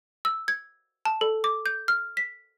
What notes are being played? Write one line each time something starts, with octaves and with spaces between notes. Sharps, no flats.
E6
G#6
A5
A4
D6
G6
F6
B6